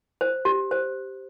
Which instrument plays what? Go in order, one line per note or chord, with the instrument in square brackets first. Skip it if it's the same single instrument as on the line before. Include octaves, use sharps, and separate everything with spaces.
[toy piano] C5
G4
C5